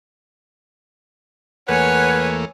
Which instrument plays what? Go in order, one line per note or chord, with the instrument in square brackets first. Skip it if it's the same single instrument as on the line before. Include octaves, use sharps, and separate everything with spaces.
[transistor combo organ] E2 A3 A#3 [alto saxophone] B4 [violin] C#5 G#5 [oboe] F#5